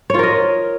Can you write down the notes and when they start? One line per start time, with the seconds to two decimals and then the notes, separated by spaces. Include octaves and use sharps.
0.10 C#5
0.14 F4
0.19 A#4
0.23 D#5